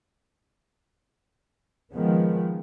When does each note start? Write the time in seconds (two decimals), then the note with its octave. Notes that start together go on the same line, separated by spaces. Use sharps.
1.92 D#3 F3 G#3 B3